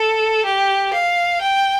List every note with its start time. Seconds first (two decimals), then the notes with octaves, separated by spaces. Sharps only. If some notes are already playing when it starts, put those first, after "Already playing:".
Already playing: A4
0.44 G4
0.93 F5
1.41 G5